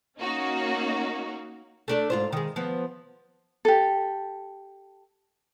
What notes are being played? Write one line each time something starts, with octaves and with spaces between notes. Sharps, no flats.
A#3 C#4 D#4 F#4
A3 D4 A4
G#2 F4 C5
D#3 G#3
F3 B3
G4 A4